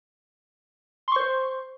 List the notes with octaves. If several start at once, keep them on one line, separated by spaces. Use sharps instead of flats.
C5 C6 C#6